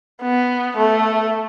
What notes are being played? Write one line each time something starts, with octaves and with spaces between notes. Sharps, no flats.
B3
A3